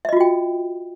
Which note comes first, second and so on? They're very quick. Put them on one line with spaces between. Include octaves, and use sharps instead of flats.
E5 D#5 F4 F#4 G5